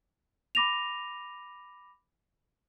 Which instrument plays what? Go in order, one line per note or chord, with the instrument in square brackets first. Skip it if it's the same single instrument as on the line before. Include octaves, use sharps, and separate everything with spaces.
[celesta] B5 D6 A#6 D#7 F7